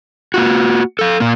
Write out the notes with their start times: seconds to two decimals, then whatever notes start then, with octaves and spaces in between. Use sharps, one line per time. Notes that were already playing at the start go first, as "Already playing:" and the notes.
0.34 A#3 F4 F#4
0.99 A4 F5
1.20 A#2 A#3